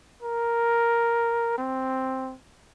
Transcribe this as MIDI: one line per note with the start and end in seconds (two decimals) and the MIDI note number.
0.23 1.54 70
1.58 2.35 60